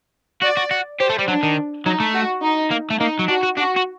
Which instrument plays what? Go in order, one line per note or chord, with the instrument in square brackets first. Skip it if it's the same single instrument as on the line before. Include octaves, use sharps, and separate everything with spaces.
[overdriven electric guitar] F#4 [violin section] D5
[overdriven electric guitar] F#4
F#4
[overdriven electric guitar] G4 [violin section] C5
[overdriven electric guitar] A3
G3
[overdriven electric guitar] F#3 [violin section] D4
[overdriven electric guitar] D#3
[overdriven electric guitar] F#3 [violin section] D#4
[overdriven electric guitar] A3
[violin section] F#4
D#4
[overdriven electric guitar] A#3
A3
[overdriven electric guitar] A#3 [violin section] D#4
[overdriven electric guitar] F#3
[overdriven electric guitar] D4 [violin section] F#4
[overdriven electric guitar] F#4
[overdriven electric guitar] D4 [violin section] F#4
[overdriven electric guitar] F#4